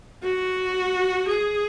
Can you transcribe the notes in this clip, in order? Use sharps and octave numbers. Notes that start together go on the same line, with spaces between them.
F#4
G#4